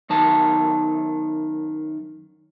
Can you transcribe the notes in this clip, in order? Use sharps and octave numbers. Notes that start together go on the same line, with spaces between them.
F#2 D#3 A5